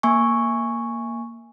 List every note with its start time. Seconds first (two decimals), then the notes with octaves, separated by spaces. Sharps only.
0.03 A#3 G#5 C#6